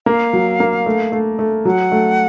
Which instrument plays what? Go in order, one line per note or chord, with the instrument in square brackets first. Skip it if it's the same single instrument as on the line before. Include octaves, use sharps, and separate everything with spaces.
[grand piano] A#3 [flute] F5
[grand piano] F#3
A#3
A3
A3
A3
[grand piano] F#3 [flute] F#5
[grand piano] A3